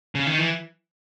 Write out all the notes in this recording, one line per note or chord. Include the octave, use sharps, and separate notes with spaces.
C#3
D#3
E3